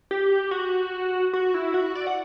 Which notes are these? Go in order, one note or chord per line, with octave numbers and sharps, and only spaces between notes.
G4
F#4
F#4
E4
F#4
D5
F#5